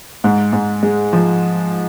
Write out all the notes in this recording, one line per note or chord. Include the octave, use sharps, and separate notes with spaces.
G#2
G#2
G#3
F3